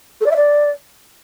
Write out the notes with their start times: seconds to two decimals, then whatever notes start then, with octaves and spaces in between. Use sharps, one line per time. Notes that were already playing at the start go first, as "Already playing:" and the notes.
0.21 A4
0.26 D5
0.31 E5
0.36 D5